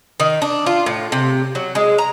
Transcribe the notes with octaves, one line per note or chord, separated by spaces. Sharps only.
D#3
D4
F4
A2
C3
F#3
G#3
A#5